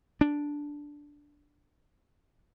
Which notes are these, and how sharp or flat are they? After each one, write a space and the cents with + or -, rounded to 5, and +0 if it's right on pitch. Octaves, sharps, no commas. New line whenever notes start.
D4 -5